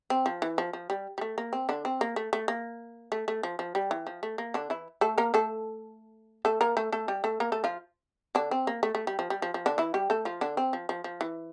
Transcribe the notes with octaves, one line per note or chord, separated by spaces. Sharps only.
C4
F3
E3
F3
F3
G3
G3
A3
A#3
C4
D3 D4
C4
A#3
A3
A3
A#3
A3
A3
F3
F3
G3
E3
F3
A3
A#3
D3 D4
E3 E4
A3 A4
A#3 A#4
A3 A4
A3 A4
A#3 A#4
A3 A4
A3 A4
G3 G4
A3 A4
A#3 A#4
A3 A4
F3 F4
D3 D4
C4
A#3
A3
A3
G3
F3
G3
F3
F3
D3 D4
E3 E4
G3 G4
A3 A4
F3 F4
D3 D4
C4
F3
F3
F3
E3